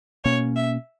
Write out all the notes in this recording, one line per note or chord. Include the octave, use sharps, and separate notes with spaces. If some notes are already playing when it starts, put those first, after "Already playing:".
B2 A#3 C#4 C#5
E5